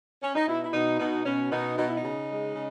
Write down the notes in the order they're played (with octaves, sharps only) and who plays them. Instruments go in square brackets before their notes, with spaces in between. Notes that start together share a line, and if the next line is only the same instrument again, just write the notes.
[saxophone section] C#4
D#4
B2 E4
E4
B2 D#4
B2 D#4
B2 C#4
B2 D#4
B2 D#4
E4
D#4
C#3
G#3
C#3